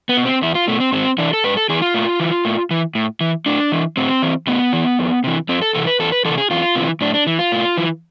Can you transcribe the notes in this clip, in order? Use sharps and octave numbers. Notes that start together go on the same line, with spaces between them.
B3
B2
C4
E2 E4
F4
B2 A3
C4
G#2 C4
E3 D4
A4
G#2 B4
A4
E3 G#4
F4
A2
E3
A2
E3
A2
E3
A2 D4
E3
A2 C4
E3
A2 B3
E3
F2
C3 E3
F2 C4
A4
C3 E3 A4
B4
E2 A4
B4
C3 E3 A4
G#4
E2 F4
C3 E3
A2 D4
D4
E3
F4
A2
E3